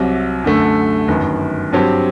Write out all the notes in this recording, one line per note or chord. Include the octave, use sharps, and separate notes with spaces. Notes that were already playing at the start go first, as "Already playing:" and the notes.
Already playing: C2 C3 F#3
F#2 D3 A3
G1 F#2 D#3
G2 F#3 C4 G4